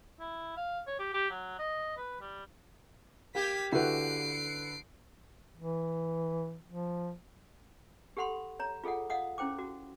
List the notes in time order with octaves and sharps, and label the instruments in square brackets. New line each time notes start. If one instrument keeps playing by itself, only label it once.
[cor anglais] E4
F5
C#5
G4
G4
F#3
D#5
B4
G3
[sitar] A#3 G4 [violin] G#6 B6
[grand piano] D3 B4 [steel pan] E4 F#4 [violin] C7 D7
[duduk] E3
F3
[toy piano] G4 A4 F#5 B5 C6
C#5 A#5
F4 G#4 A4 D#5 F#5
D#5 F5 F#5 D#6
C#4 E4 C5 G5 D6
F#4